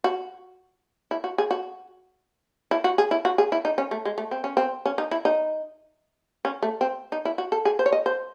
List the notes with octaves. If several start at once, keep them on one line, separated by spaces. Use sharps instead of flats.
F#4
E4
F#4
G#4
F#4
E4
F#4
G#4
E4
F#4
G#4
E4
D#4
C#4
A3
G#3
A3
C4
C#4
C4
C#4
D#4
E4
D#4
C#4
A3
C4
D#4
E4
F#4
A4
G#4
C5
C#5
D#5
C5